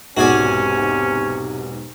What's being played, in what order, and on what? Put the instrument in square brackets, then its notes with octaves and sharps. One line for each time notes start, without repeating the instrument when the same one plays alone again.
[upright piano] E1 B1 G#2 [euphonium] C3 [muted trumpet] C#4 [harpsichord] F#4 G#4 D5